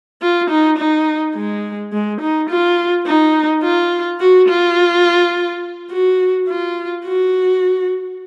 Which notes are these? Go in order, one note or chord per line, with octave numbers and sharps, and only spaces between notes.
F4
D#4
D#4
G#3
G#3
D#4
F4
D#4
F4
F#4
F4
F#4
F4
F#4